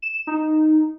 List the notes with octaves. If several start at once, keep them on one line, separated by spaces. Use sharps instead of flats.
E7
D#4